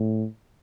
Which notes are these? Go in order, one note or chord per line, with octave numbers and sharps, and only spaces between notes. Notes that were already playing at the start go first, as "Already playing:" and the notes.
Already playing: A2